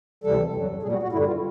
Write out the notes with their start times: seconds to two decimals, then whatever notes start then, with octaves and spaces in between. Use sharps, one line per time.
0.24 D2 C3 E3 G3 A4
0.54 F#2 D3 F#3
0.82 A#2 G3 G#4
0.92 F#4
1.03 F#4
1.12 G2 D3 G3 E4
1.27 F4